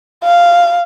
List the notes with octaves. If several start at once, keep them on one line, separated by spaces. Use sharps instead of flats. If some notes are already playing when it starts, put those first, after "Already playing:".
F5